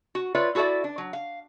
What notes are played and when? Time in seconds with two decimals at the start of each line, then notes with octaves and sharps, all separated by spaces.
0.15 F#4
0.35 F4 B4 C#5 D5 E5
0.55 E4 F#4 A4 C#5 D5 E5
0.84 D4
0.98 F#3
1.13 F5